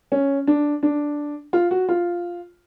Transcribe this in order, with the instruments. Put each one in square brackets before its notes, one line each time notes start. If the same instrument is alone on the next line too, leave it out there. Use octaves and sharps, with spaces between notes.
[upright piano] C#4
D4
D4
F4
F#4
F4